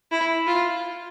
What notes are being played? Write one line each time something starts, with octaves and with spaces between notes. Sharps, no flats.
E4
F4